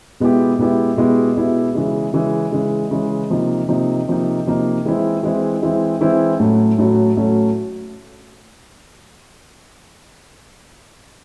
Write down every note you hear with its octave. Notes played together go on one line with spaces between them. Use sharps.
B2 G#3 B3 E4 G4
B2 G#3 B3 E4 G4
B2 G#3 B3 E4 G4
B2 G#3 B3 E4 G4
C#3 E3 G#3
C#3 E3 G#3
C#3 E3 G#3
C#3 E3 G#3
C3 F3 A#3 D#4
C3 F3 A#3 D#4
C3 F3 A#3 D#4
C3 F3 A#3 D#4
E3 G#3 C4 E4
E3 G#3 C4 E4
E3 G#3 C4 E4
E3 G#3 C4 E4
A2 F#3 A3 C#4 F#4
A2 F#3 A3 C#4 F#4
A2 F#3 A3 C#4 F#4